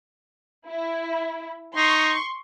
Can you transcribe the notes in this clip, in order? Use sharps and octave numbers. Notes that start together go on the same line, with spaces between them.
E4
D#4 C6 C#6